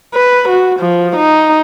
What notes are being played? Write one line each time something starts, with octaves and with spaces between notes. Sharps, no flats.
B4
F#4
F3
D#4